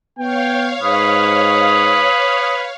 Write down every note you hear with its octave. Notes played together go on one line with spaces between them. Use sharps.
B3 C#5 F5 G5
G#2 B4 D#6